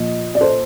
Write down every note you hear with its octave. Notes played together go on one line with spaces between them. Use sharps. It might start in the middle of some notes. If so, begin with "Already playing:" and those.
Already playing: A#2 F3 D#5
D5
A4 C5